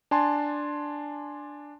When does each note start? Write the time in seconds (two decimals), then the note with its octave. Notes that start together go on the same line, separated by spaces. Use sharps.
0.11 D4 G#5 A5 C6